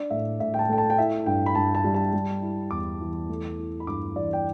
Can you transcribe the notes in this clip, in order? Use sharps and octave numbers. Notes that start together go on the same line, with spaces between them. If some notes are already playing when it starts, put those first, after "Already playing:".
Already playing: D4 D5
A2 E5
A2 E5
G5
A5
A3 G5
A5
G5
E4 E5
G2 G5
B5
G2 A5
A5
G3
A5
G3
E4
E2 D6
E3
A3
E4
B5
G2 D6
E3 D5
G5